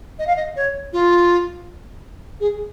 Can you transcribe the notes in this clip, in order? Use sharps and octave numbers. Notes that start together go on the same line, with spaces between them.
D#5
F5
D#5
C#5
F4
G#4